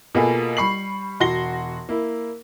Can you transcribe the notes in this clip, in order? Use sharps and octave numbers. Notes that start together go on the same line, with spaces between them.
B2 A#3 B3 F4 G#4 A4
G3 B5 C#6 C7 F#7
E1 F#4 C6 A#6 G7
A#3 E4